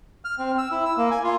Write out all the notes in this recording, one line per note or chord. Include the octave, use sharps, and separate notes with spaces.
F6
C4
E6
E4
E6
A#3
G#5
F4